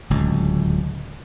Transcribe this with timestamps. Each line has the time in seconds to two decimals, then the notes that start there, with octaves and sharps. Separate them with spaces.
0.10 D1 C#2